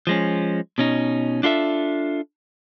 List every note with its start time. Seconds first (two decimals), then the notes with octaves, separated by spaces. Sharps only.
0.07 F3 G#3 C#4
0.78 B2 C#4 D#4
1.43 D4 F4 A4 E5